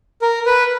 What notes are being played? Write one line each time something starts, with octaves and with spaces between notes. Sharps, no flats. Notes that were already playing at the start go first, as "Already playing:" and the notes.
A#4
B4